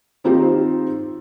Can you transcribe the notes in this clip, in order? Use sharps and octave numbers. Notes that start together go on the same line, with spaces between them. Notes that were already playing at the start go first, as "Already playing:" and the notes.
D#3 C4 D#4 F4 G4 C5